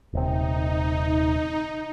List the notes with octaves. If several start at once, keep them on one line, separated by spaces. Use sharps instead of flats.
D#1 C3 D#4